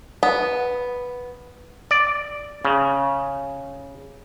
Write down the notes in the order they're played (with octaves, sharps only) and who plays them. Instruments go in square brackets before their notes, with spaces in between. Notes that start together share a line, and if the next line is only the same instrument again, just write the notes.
[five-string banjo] B3
[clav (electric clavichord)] D5
C#3